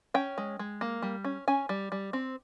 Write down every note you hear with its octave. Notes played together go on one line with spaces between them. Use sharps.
C#4 G5
G#3
G#3
A#3
G3
C#4
C#4 G#5
G3
G3
C4